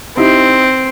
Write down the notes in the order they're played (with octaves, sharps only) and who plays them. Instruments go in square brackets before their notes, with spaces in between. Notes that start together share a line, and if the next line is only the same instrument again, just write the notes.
[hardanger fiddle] C4 [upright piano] D#4 E4 G4